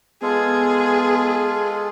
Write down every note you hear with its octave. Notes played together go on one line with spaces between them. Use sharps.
G#3 B3 F4 G#4 A4